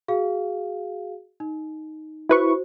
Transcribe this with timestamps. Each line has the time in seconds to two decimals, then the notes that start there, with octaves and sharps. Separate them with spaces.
0.08 F#4 G#4 F5
1.40 D#4
2.29 E4 F#4 B4 C5 C#6